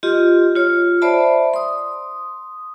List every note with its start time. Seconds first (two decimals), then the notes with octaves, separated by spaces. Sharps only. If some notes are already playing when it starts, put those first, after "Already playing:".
0.03 F4 G4 D#5 C6
0.56 F4 C#5
1.02 C5 D5 E5 A5 B5
1.54 C6 D#6